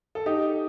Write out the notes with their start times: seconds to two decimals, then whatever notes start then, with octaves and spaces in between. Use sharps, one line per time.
0.15 A4
0.26 D#4 G4